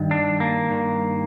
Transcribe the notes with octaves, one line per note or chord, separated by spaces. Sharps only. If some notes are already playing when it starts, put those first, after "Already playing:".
Already playing: G2 D#3
D4
A#3
G2 D#3